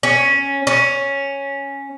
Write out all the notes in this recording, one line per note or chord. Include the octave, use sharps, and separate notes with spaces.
C#4
C#4